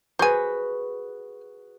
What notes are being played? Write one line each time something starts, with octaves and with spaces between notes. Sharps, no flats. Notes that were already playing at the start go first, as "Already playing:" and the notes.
F#4 G#4 B4 C5 G#5